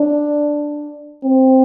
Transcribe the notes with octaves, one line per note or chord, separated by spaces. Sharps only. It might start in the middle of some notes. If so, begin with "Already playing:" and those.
Already playing: D4
C4